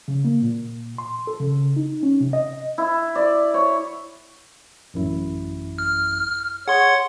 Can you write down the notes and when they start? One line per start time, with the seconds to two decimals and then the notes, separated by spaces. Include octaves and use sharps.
0.08 C#3
0.25 A#3
0.42 A#2
0.98 C6
1.27 A4
1.40 C#3
1.76 D#4
2.03 C#4
2.20 C3
2.33 D#5
2.78 E4
3.15 D5
3.54 C#5
4.94 A1 F#2 E4
5.78 F6
6.68 G#4 C#5 F#5 C6